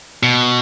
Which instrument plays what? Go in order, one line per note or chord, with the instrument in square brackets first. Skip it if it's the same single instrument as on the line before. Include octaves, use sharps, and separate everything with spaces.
[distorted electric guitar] B2